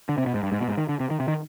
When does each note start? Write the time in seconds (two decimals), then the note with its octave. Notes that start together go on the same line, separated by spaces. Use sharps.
0.09 D3
0.18 C3
0.26 B2
0.34 G#2
0.43 G2
0.52 G#2
0.60 B2
0.68 G#2
0.77 D#3
0.89 D3
1.00 C3
1.10 D#3
1.20 C3
1.28 D#3